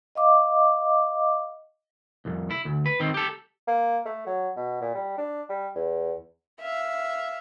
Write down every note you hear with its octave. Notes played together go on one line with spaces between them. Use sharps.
D#5 F5 D6
C2 F2
E4
D2
B4
D#3 C4
G4 A4
A#3
A3
F#3
B2
A#2
G3
D4
G3
E2
E5 F5